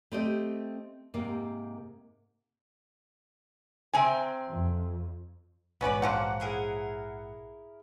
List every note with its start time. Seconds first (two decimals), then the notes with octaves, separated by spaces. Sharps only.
0.12 A3 C4 G4 D#5
1.14 G#2 C3 A#3
3.93 C3 C4 G#5
4.51 F2
5.81 A#1 G#2 B3 C#4 F#4 B4 D5
6.02 C#3 F3 A#3 F#5
6.40 E4 G#4 A#4